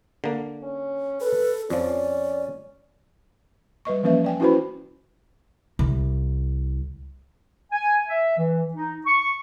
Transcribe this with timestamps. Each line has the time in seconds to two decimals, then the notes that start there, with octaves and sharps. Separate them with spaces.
0.24 D3 A#3
0.63 C#4
1.21 A4 B4
1.70 F2 F3 C#4 D5
3.85 G3 B4 D#5 C#6
4.03 E3 F3 A#3 C#4 B4 E5
4.24 D5 G5 G#5
4.40 C#4 E4 F#4 B4 C5 B5
5.79 C2
7.72 G#5
8.08 E5
8.38 E3
8.74 D#4
9.06 C#6